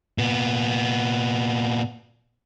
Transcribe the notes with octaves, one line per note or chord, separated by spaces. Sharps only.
A#2 B3